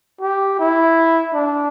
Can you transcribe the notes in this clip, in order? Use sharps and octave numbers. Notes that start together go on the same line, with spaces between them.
G4
E4
D4